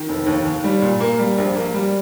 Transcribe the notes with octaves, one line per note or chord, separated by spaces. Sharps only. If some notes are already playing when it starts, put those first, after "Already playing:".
Already playing: D#3
F1
D#2
D#2
G3
A#2
A#3
G3
A#1
A#3
G3